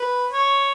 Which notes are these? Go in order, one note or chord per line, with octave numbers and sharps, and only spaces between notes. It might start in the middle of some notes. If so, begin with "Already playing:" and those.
Already playing: B4
C#5